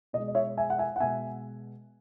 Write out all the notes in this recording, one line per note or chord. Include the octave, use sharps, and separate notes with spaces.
B2 G#3 D#5
D#5
C#5 E5
E5 G#5
F#5
E5 G#5
F#5
B2 G#3 E5 G#5